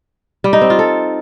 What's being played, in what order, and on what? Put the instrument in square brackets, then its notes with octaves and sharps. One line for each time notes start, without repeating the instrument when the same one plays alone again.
[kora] G3
D#4
C4
F4
A4